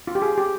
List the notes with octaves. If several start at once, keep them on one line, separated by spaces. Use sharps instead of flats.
F4
G4
G#4
G4